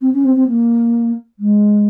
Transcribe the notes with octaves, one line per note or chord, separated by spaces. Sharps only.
C4
C#4
C4
C4
A#3
G#3